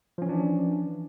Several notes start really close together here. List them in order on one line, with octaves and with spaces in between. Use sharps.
F3 C#4 E3 D4